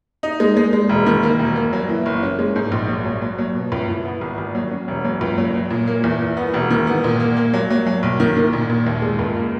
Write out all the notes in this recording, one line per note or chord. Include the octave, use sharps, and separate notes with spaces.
D#4
G#3
G#3
G#3
E1
D#3
A#3
E1
A#3
F#3
E3
F#1
C#4
G#3
G#2
A#1
F#3
F#3
F#3
F#3
B2
C#2
E3
B3
G#1
G#1
F#3
C#4
E1
F#3
C#2
F#3
F#3
A#2
A#3
E2
E3
B3
E1
D#3
B3
A#2
A#3
A#3
F#3
F#3
F#3
B1
D#3
D#3
A#2
A#2
D#2
G#3
C#2
A#3